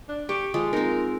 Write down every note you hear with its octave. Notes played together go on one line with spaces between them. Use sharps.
D4
G4 C#6
F3 G#3 F4 D#5
C4 D#4 A#4